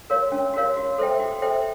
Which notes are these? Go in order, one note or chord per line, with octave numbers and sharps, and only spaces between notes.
F#4 A#4 C#5 F5
C#4
F#4 A#4 C#5 F5
F#4
A4 C5 E5 G5
F#4
A4 C5 E5 G5